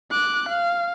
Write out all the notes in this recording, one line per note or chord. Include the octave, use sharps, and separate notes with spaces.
D6 F#6
F5